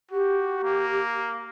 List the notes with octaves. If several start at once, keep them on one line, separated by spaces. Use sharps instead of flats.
F#4 G4
A#3